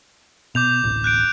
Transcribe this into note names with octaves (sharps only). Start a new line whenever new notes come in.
B2 D6 G6 F7
D1 A1
F#6 G6 D7